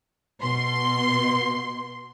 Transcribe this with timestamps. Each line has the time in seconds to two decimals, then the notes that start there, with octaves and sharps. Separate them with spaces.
0.41 B2 C6